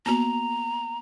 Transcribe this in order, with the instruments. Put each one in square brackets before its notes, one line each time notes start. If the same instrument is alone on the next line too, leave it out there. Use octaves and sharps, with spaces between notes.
[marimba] A#3 B3 F#4 [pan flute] A#5